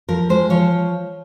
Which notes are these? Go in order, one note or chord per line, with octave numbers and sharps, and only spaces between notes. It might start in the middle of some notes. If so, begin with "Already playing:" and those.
F3 A#4
G#3 C5
F3 C#5